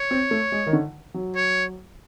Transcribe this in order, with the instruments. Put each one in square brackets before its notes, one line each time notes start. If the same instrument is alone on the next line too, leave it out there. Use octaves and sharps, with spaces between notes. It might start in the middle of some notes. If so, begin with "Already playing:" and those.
Already playing: [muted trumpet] C#5
[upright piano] C4
A3
G#3
D#3
D3
F#3
[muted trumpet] C#5